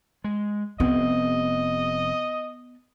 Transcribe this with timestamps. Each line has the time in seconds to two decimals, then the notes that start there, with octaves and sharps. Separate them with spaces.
0.24 G#3
0.80 F1 B3 C4 D#5